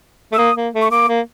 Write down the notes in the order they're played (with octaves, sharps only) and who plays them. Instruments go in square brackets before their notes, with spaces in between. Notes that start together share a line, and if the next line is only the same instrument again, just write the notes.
[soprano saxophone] A3 [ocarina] E6
[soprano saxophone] A#3 [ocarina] D#6
[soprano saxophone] A#3
A3
[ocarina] C#6
[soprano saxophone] A#3 [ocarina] D6
[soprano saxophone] A#3